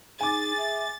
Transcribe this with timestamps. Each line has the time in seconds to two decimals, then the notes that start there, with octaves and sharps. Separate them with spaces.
0.21 D#4 G#4 G#5 D6 A6
0.58 E5